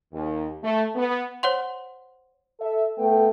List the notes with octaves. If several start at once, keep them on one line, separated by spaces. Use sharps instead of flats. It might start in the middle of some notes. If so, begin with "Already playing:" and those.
D#2
A3
B3
C5 C#5 F#5 C6
A4 E5
A3 B3 A4 G5